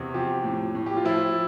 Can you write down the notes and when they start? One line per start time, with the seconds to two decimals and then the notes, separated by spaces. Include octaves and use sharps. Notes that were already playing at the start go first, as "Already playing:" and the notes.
Already playing: E2 C3
0.14 F3 G4
0.44 A2
0.75 A2
0.86 G4
0.97 F4
1.05 F3 E4